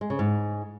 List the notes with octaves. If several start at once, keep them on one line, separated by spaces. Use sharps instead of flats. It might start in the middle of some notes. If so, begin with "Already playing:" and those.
G#3
C#3
G#2